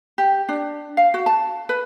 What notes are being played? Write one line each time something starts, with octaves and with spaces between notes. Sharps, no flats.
G4
D4
F5
F#4
A5
B4